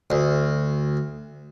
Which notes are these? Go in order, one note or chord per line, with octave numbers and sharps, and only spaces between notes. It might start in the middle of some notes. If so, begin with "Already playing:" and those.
D2